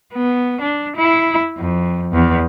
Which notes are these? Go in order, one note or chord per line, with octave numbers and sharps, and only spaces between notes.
B3
D4
E4
F2
E2